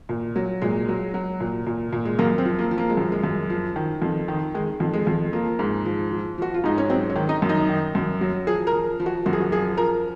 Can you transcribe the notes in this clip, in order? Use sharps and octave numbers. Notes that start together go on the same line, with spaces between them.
A#2
F#3
A#2 G#3
F#3
F#3
A#2
A#2
A#2
G#3
F#2 A#3
C4
F3
A#3
F3
A#3
G#3
F#2
G#3
F#2
F3
D#3
F2
D#3
D#3 G#3
F2
G#3
F2
F3 A#3
G#2
F3
F3
F3 F#4
F4
G#2 D#4
C#4
F#3 C4
C#4
D#3
D#4
F#2
D#4
D#3
F#2
F#3
F3 G#4
A#4
F3
F3
F#4
F#2 F#4
G#4
F#4
F3 G#4
F3 A#4